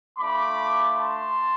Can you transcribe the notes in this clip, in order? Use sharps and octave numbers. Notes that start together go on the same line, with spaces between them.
A3 D4 F4 B5 D6
A5 C6